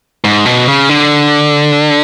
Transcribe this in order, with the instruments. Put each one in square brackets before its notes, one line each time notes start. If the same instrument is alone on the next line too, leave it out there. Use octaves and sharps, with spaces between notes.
[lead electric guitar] G#2
B2
C#3
D3